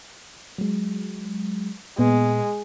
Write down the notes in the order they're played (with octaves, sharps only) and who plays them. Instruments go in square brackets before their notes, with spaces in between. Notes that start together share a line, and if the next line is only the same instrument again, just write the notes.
[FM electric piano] F#3 G#3
[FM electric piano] A#2 B3 [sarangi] G#3